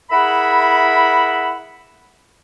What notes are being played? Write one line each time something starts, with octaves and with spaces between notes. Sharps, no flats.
E4 G#4 A#4 E5 F#5 B5